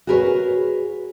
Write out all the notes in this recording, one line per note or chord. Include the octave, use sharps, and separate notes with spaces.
F#4 G#4 A#4 B4 C#5